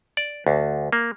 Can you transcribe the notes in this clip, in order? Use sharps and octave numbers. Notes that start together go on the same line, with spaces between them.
D5
D2
A#3